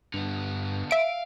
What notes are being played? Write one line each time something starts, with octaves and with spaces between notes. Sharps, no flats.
G2 D3 B3
E5 F5 D7